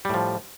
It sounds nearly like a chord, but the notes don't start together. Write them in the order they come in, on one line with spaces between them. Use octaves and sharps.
G3 A2 F3